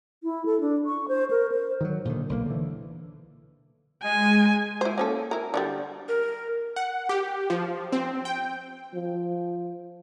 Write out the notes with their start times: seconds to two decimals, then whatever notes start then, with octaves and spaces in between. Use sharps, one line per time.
0.24 E4
0.45 A4
0.61 D4
0.86 C#6
1.08 C5
1.31 A#4
1.52 C5
1.81 D#3 E3 F#3
2.05 A#2 D3 D#3
2.29 B1 A#3
2.46 D3 E3
4.04 G#3 G#5
4.81 E4 C5
4.98 A#3 C#4 A4
5.31 E4 A#4
5.54 D3 F3 G3
6.08 A#4
6.76 F#5
7.09 G4
7.50 F3
7.92 C4
8.25 G5
8.94 F3